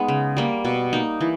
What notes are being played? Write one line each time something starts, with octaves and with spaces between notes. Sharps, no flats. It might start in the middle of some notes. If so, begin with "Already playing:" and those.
Already playing: G#3 B3 D#4
C#3
G3 A#3
B2
A#3 D#4
E3